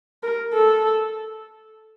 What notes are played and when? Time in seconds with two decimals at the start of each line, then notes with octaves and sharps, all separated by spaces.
0.23 A#4
0.53 A4